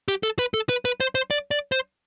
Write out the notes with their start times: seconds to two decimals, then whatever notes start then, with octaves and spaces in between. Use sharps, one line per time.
0.08 G4
0.23 A4
0.39 B4
0.54 A4
0.69 B4
0.85 B4
1.00 C5
1.15 C5
1.31 D5
1.51 D5
1.72 C5